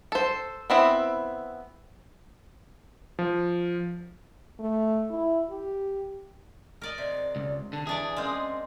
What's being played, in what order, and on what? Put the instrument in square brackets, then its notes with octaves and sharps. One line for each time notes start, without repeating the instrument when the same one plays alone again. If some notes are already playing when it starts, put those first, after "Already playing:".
[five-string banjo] A4 C5
B3 C4 E4
[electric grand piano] F3
[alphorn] A3
E4
G4
[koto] A#4 D5 D#5
[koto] C3 [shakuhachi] D5
[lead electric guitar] C#2
[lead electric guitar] D3 [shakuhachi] A5
[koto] E3 D4 D5 [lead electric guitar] G#4
[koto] G#3 A#3 C4 [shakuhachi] C#4